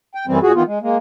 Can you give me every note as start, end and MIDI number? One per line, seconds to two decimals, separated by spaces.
0.15 0.26 79
0.27 0.39 42
0.27 0.39 52
0.27 0.39 55
0.27 0.39 60
0.43 0.52 46
0.43 0.52 66
0.43 0.52 68
0.55 0.63 51
0.55 0.63 52
0.55 0.63 59
0.55 0.63 65
0.67 0.79 56
0.82 0.97 56
0.82 0.97 58